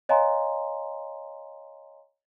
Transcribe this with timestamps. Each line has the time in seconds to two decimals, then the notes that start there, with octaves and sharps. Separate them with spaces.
0.09 C#5 D#5 F5 G#5 A#5 C6